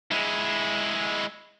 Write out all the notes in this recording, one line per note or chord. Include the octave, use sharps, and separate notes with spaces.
G#3 E4